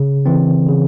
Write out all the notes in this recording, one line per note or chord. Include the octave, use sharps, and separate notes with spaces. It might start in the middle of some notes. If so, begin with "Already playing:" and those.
Already playing: C#3
E3 C4
C#3